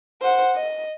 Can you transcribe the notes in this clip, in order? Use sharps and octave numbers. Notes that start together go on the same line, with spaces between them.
C5 F#5
D#5